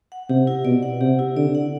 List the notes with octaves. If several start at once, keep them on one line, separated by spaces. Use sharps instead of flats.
F#5
C3 G4
E4
B2 D5
F#5
C3 G4
E4
D3 D5
F#5